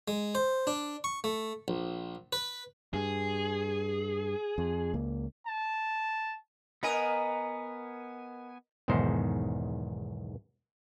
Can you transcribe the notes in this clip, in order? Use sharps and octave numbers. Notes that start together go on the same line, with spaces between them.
G#3
C5
D4
C#6
A3
A#1
B4
G2 G#4
F2
C#2 A#3
A5
B3 A#4 B4 D#5 G#5
B1 E2 G#2 D#3 C5